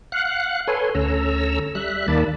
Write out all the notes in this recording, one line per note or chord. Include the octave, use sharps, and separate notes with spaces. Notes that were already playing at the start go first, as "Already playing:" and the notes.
F5 F#5 F#6
A4 B4 C#5 G#5 C6
D2 C#4 A4 A#5 E6
G3 E5 F#6
D#2 D#3 A#3 D5 A5 B5